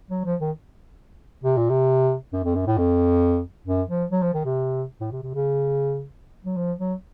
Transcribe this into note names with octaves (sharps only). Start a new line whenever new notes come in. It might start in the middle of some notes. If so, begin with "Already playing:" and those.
F#3
F3
D#3
C3
A#2
C3
F#2
F2
F#2
A2
F2
F#2
F3
F#3
F3
D#3
C3
A2
C3
C3
C#3
F#3
F3
F#3